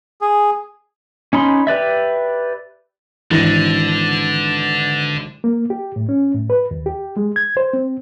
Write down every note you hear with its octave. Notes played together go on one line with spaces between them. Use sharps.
G#4
C#4 D#4 B5 C6
G4 B4 D5 E5
G#1 D3 E3 D4 A#6
A#3
G4
A2
C#4
A2
B4
D#2
G4
G#3
G#6
C5
C4